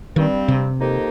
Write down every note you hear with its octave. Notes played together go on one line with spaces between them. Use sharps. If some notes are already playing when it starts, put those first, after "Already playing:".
G2 D#3 G3 C4
C3
F2 D#3 A#3 D#4 G4